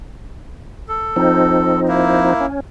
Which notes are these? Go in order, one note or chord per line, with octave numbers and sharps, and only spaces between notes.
A4
F3 C4 D#4
A#3 E4
C#4